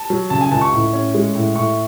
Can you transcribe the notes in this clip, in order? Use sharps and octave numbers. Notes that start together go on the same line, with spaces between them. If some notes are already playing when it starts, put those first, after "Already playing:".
Already playing: A5
F#3
C#3 A5
G#5
C#2 A5
C#6
A2
C#4
G#3
A2
A2 C#6